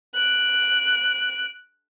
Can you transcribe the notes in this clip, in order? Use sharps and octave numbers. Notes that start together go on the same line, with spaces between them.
F#6 D7